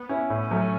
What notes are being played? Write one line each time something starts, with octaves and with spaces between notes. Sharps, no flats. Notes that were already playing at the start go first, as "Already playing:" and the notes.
Already playing: B3
C#4 E4
A2 C#4
F#3 A3